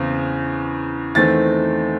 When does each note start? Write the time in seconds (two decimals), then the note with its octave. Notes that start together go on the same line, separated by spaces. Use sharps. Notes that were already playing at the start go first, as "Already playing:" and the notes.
Already playing: E2 C#3 E3 C4
1.15 E2 D#3 A3 C4 A6